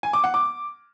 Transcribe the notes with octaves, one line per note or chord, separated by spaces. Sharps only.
G#5
D6
F#5
D6